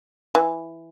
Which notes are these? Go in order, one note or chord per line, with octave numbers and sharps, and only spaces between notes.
E3